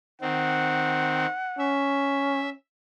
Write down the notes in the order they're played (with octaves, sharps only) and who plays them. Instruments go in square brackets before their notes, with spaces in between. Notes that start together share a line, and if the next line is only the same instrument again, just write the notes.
[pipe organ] D#3 C4 [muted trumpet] F#5
[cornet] C#4 [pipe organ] E5